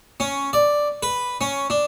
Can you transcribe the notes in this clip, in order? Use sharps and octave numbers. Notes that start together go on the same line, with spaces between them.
C#4
D5
B4
C#4
D4